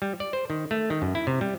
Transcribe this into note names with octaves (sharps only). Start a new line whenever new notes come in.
G3
D5
C5
D#3
A3
D#3
F#2
E4
C3
G3